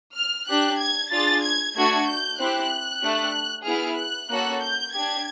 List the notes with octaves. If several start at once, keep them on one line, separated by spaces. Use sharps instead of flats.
F6
D4 G4 F#6
G#6
D4 F4 G#4 A6
G#6
A3 D4 F#4 G#6
G6
C4 E4 G4 F#6
A3 D4 G4
B3 E4 G#4 F6
F#6
A#3 C#4 F#4 A4 F#6
G6
D4 G4 G#6